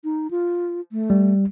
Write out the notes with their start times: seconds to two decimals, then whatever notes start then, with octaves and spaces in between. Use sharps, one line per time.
0.04 D#4
0.31 F4
0.92 A3
1.10 G3